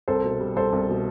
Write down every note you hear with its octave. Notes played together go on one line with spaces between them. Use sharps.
C2 A4 C5
B2
G3
C2 A4 C5
C2
B2